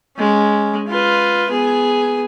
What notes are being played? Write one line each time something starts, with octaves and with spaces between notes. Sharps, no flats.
G#3 C#4
F4 B4
B3 G#4